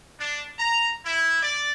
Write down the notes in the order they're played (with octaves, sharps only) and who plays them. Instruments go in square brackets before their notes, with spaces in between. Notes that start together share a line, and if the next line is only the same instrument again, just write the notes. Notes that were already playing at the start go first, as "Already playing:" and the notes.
[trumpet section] D4
A#5
E4
D5